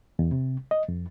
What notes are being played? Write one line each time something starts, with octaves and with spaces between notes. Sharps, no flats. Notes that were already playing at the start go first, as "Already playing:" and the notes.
E2
C3
D#5
F2